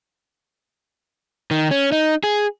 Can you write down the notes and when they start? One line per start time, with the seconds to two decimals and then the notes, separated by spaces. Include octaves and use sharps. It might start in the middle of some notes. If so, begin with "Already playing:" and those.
1.51 D#3
1.71 C#4
1.92 D#4
2.24 G#4